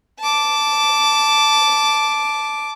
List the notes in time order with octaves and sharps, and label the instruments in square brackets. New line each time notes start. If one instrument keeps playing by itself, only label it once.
[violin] A5 D6